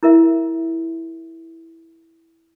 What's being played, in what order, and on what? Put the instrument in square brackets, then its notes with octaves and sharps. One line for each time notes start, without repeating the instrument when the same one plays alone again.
[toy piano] E4 A#4 E5